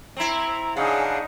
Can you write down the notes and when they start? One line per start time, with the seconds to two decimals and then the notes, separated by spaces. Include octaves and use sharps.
0.17 C4 E4 A#5
0.77 C#3 D4 D#4 G#4 F5 F#5